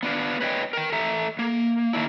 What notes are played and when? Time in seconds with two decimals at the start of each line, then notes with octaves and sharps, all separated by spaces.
0.03 B3 D4 F4
0.40 B4 C#5 D#5 E5 G5
0.73 A#4 G5
0.92 A4 E5 A#5
1.39 A#3
1.93 D#3 A#3 D4 E4